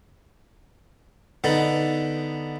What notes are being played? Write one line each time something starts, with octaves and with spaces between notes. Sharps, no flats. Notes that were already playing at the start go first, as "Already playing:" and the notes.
D3 B3 D#4